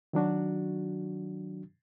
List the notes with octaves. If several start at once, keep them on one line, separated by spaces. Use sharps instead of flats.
D#3 F#3 D4 F#4